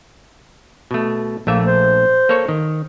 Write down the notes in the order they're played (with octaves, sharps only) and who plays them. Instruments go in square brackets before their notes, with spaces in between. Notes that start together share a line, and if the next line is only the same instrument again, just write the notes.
[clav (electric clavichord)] B2 A3
[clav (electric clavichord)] A#1 A3 E5 [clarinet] A#3
[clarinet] C5
[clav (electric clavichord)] A#3 A4 C#5
D#3